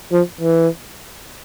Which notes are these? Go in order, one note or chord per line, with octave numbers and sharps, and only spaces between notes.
F3
E3